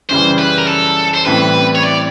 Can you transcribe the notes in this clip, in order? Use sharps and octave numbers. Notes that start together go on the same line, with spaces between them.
F#2 C#3 E3 G3 C5
B4
A#4
A4
C5
A1 A2 E3 G3 C4 B4
C#5
D5